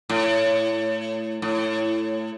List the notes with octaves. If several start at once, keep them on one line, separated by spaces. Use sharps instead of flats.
A2
A2